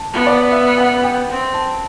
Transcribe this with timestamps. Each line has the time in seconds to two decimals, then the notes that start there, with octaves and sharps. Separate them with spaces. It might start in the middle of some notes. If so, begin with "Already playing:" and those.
Already playing: A5
0.13 B3
0.27 D5
0.52 E5
0.78 F#5
1.04 G5
1.29 C4
1.54 A5